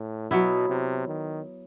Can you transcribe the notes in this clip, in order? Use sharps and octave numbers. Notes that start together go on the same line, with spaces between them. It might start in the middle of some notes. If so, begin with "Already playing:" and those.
Already playing: A2
B2 F#3 B3 E4
C3
D#3